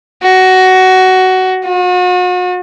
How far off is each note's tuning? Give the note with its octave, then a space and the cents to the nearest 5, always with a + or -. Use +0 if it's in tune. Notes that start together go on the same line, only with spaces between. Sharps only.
F#4 +15
F#4 -40